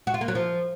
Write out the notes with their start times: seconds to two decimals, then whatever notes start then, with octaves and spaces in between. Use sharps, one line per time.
0.07 F#4
0.14 F4
0.21 A#3
0.28 F#3
0.35 F3